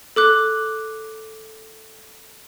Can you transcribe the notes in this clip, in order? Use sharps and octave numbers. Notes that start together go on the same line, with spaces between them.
A4 D6 F#6